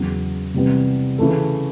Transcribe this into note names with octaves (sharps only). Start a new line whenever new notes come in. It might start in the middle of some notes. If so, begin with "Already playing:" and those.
Already playing: E2 C#3 F#3
C3 E3 G3 B3
C#3 E3 A3